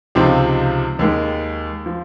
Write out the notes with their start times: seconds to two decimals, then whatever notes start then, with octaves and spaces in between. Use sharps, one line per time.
0.15 C#2 C3 F3 C4 D#4
0.99 D#2 D#3 G#3
1.86 F3